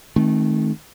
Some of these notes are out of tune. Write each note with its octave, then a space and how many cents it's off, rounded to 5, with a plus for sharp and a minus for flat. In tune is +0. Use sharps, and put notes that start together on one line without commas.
D#3 +15 A3 -20 C4 +35